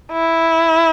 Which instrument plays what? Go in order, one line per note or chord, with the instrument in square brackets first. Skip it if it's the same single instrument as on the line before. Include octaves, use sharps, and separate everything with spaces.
[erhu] E4